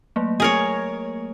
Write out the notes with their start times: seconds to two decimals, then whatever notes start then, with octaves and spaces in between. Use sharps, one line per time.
0.16 F#3 A3 A#3
0.40 G#4 A#4 C#5